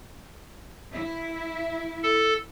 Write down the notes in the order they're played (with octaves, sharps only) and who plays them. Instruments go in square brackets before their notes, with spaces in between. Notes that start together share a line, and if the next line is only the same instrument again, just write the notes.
[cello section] E4
[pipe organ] A4